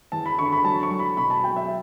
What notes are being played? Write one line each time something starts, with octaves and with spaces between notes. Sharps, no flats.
E2 A5
B5
D3 C#6
B5
F#3 A5
C#6
F#3
B5
B2 B5
A5
F#3 G5
E5